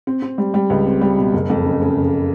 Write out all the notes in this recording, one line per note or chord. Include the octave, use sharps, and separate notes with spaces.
C4
C4
G3
G3
C#2
C4
G3
B2
F#1
F2
C#3
C#3
F#1